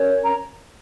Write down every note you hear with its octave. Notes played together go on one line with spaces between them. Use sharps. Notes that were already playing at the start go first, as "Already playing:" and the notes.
Already playing: C#4 A#4 C#5
A#5